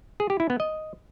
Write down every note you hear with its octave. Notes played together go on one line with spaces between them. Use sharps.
G#4
G4
E4
B3
D#5